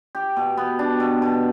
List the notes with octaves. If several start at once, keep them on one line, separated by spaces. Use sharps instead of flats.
G4
B2
B3
D4
B2
B2